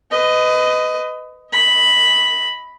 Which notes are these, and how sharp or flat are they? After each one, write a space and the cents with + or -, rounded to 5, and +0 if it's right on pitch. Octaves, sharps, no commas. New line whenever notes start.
B4 +30 D#5 +0
D#5 +30 B5 +0